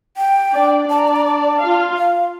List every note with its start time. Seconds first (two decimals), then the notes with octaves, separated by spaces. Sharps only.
0.17 G5
0.53 D4 D5
0.89 D4 D5 A5
0.99 A#5
1.08 A5
1.16 A#5
1.26 A5
1.61 F4 F5
1.97 F5